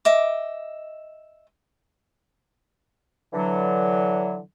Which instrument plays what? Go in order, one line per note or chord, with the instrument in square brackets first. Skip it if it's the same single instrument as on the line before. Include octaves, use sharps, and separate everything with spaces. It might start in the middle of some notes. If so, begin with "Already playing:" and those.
[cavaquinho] D#5 E5 D6
[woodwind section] D3 E3 F#3